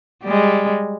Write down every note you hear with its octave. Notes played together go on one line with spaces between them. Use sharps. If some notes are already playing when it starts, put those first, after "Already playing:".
G3 G#3